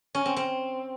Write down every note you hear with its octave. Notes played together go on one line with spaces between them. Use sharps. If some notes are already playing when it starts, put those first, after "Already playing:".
C#4
C4
C4